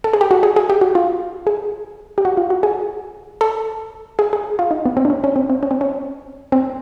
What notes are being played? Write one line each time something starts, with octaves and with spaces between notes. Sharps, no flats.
A4
G#4
G4
F#4
G#4
G#4
G4
F#4
F4
G#4
G4
F#4
F4
F#4
G#4
A4
G#4
G#4
F4
D#4
B3
C4
D4
C#4
C#4
C4
C4
C#4
C4
C#4
C4